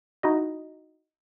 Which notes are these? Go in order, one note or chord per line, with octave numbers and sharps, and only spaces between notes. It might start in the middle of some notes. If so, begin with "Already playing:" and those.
D#4 E4 F#4 D#5